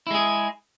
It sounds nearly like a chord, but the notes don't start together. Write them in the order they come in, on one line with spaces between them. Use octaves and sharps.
E4 G#3 G#4